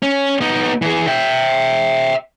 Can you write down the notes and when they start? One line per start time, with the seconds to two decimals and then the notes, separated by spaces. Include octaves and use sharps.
0.03 C#4
0.41 B3 D#4
0.82 E3 G#4
1.07 E5 G5